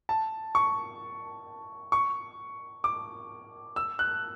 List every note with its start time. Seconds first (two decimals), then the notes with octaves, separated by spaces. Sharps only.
0.09 A5
0.55 C#6
1.92 C#6
2.84 D6
3.76 E6
3.99 F#6